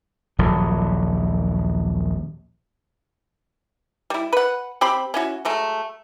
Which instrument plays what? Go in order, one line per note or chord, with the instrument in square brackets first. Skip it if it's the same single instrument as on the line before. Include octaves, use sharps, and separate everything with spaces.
[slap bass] D#1 A#1 F#3
[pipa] G3 E4
B4 F#5
C4 G4 C5 B5
C#4 E4 F#4
F#3 G#3 A3